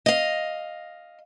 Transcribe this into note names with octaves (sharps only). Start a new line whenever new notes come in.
D#5 F5